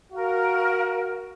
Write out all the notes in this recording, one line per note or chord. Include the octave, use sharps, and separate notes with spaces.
F#4 A#4 F5